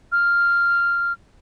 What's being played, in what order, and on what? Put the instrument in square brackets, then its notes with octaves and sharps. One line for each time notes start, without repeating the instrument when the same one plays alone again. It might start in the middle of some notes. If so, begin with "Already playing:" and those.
[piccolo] F6